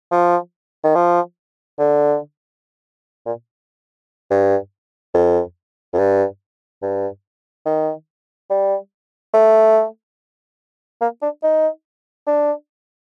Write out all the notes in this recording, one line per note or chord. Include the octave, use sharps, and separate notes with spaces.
F3
D#3
F3
D3
A#2
G2
F2
F2
G2
G2
D#3
G3
A3
A#3
D4
D#4
D4